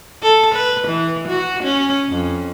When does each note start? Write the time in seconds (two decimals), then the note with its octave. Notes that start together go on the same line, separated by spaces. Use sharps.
0.23 A4
0.54 B4
0.87 E3
1.28 F#4
1.63 C#4
2.09 F2